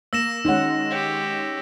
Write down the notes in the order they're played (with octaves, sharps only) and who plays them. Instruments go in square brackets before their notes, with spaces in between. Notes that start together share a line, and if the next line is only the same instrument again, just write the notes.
[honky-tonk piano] A#3 [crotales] E6 A#6 E7
[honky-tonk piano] D#3 G#3 C#4 [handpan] D#4 F#5
[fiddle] G4 C#5